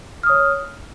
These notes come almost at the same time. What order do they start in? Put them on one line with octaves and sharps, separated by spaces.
F6 D#6 C#5